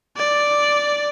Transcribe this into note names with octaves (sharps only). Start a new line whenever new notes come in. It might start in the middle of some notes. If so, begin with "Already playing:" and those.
D5